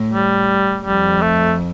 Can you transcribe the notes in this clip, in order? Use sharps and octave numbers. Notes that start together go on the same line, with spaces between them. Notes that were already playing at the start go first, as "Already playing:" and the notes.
Already playing: A2
G3
F2 G3
A3